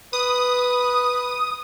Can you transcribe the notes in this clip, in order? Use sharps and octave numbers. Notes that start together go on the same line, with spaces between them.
B4 D#6